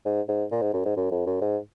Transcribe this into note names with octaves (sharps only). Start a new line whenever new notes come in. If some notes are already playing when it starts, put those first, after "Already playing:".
G#2
G#2
A#2
G#2
F#2
G#2
F#2
F2
F#2
G#2